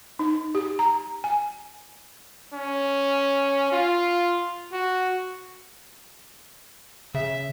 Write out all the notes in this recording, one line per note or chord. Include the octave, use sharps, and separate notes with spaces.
D#4
G4
A#5
G#5
C#4
F4
F#4
C#3 E5